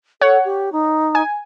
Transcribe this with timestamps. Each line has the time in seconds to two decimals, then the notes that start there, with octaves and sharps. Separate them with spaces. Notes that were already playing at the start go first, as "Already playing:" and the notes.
0.21 A4 C#5 F#5
0.45 G4
0.72 D#4
1.15 G#5